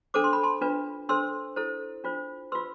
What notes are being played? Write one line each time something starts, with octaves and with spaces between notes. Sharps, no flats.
D4 A4 C5 D6
C6
B5
A5 C6
D4 F4 B4
D4 A4 C5 C6 E6
E4 A4 C5
D4 F4 C5
F4 B4 C6 E6